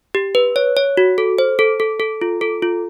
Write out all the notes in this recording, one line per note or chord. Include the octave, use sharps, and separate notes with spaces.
G4
B4
C#5
C#5
F#4
A4
C5
A4
A4
A4
F4
A4
F4